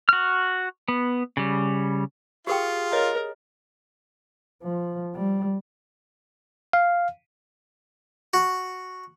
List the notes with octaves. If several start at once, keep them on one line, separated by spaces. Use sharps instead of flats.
F#4 F6
B3
C#3 G3
F4 G4 G#4 A#4 G5
A#4 C#5 D#5
F3
G3
F5
F#4